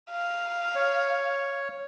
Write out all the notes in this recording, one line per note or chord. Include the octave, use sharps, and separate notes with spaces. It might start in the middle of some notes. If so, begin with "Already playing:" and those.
F5
C#5